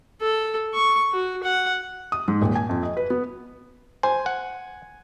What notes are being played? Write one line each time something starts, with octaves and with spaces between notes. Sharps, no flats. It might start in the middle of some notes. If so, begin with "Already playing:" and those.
A4
C#6
F#4
F#5
D#6
G#2
D#1
G#5
F2
D#5
B4
B3
C5 G#5
F#5